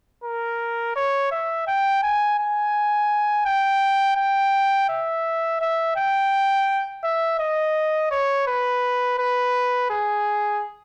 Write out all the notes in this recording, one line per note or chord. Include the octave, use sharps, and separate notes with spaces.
A#4
C#5
E5
G5
G#5
G#5
G5
G5
E5
E5
G5
E5
D#5
C#5
B4
B4
G#4